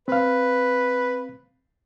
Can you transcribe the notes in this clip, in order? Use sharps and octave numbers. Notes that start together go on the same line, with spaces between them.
C4 B4 F5